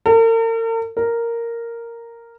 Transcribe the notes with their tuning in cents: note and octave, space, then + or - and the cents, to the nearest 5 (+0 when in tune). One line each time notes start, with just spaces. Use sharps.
A#4 -45
A#4 -5